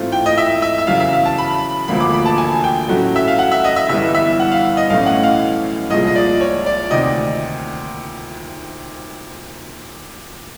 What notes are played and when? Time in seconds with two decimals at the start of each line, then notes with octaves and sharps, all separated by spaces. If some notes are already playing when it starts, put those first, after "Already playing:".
Already playing: G#2 E3 A3 C4 F4
0.12 G5
0.26 D#5
0.38 E5
0.62 E5
0.78 E5
0.87 E2 C#3 F#3 F5
1.00 E5
1.13 F5
1.26 A5
1.38 B5
1.88 E1 D2 D3 F3 A#3 B5
2.00 D6
2.13 B5
2.26 A5
2.38 G#5
2.64 G5
2.89 A2 F#3 A3 C#4 F#4
3.16 E5
3.28 F5
3.39 F#5
3.52 E5
3.64 D#5
3.76 E5
3.89 G1 G2 E3 G3 B3 E5
4.15 E5
4.40 F#5
4.52 F5
4.77 D#5
4.90 B1 A2 E3 A3 C#4 F5
5.06 F#5
5.23 F5
5.90 C2 A#2 F3 G#3 D#5
6.07 D#5
6.16 D5
6.41 C#5
6.66 D5
6.91 D2 C3 D#3 D#5